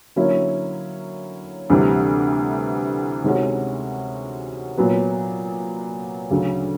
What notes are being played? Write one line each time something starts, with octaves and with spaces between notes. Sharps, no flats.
D3 F#3 A#3 C#4 E4
D2 C3 E3 G3
C3 D#3 G#3 C#4 F#4
A#2 F#3 B3
D2 C#3 F#3